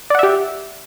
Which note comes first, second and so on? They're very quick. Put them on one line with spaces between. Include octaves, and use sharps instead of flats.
D5 F#5 E5 G4